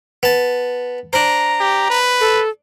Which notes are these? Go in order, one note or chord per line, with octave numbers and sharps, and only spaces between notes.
B3 A5
D4 C5 A#5
G4
B4
A4